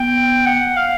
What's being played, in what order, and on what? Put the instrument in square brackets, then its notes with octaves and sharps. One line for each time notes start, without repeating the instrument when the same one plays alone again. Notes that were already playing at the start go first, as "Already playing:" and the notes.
Already playing: [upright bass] B3 [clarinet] G5
[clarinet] F#5
F5